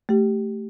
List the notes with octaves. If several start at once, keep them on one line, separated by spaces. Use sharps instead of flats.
A3 G4